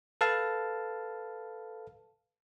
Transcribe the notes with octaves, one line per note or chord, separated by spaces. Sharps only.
A4 B4 F5 A5